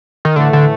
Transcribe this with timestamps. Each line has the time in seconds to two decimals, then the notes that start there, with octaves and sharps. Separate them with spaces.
0.25 D#3
0.36 A2 D3 E3 A3
0.53 D3